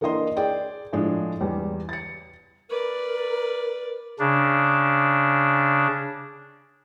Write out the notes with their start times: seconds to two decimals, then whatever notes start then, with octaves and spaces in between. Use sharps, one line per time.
0.01 E3 A#3 D4 D#5 C6
0.37 G#4 D5 G5
0.93 A2 F3 G#3 D4
1.41 E2 G3
1.89 A6 C#7
2.70 A#4 B4 D5
4.19 C#3 D4